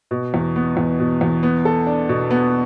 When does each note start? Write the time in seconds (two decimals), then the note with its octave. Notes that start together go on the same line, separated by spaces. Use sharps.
0.11 B2
0.34 E2
0.56 B3
0.77 E2
1.00 B2
1.21 E2
1.43 B3
1.65 A4
1.87 D4
2.09 B2
2.31 B3